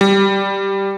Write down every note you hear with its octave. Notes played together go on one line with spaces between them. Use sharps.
G3